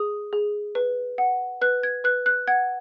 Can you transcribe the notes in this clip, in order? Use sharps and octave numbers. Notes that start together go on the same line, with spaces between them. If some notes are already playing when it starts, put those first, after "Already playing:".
Already playing: G#4 D#6
G#4
B4
F#5
B4 F#6
G#6
B4 F#6
F#6
F#5 G#6